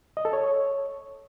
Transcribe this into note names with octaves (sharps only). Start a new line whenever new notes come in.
D#5
A4
C#5